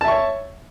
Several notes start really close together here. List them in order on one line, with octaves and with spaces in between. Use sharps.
A5 E5 C#6 C#5